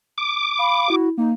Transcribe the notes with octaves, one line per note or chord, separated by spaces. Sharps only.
D6
F5 B5
E4 F#4
A#3 D#4